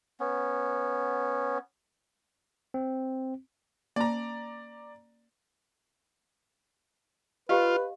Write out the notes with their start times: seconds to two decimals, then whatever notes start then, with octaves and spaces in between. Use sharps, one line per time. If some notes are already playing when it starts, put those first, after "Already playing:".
0.20 B3 C#4
2.74 C4
3.96 A#3 C#4 D5 A5 A#5
7.49 F4 G4 B4 D#5 F5